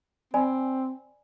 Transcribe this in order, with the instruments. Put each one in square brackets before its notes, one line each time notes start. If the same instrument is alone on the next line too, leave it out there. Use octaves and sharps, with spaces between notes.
[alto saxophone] C4 [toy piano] D5 G#5 B5